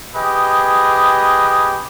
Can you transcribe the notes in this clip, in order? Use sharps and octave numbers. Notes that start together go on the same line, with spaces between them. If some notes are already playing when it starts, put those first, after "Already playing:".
G4 G#4 B4 D#5